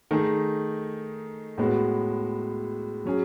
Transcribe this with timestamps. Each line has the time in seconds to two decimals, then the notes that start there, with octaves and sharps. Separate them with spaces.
0.11 D#3 A3 D#4 G#4
1.58 A2 G#3 B3 F#4
3.05 F#3 C#4 G#4